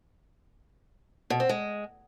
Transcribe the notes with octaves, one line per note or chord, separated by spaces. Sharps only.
B2
C4
G#3